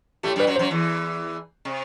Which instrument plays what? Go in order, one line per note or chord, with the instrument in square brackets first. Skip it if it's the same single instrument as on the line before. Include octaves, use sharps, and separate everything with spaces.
[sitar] A2 A3 [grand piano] G4
[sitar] G2 G3
[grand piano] B4
[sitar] F#2 F#3
[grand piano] C5
[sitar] F#2 F#3
E2 E3
C3